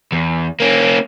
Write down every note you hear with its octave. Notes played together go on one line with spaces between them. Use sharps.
E2
A#3 C#4